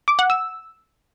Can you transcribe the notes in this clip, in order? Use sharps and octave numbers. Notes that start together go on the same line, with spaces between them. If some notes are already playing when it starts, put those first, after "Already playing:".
D6
F#5
E6